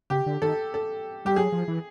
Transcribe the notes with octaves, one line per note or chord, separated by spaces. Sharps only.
C#3 G4
D3
D#3 A4
A4
G3 G4
F#3 G#4
F3
E3